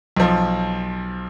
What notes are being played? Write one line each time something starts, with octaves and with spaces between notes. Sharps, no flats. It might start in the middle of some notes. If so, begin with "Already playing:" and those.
B1 F3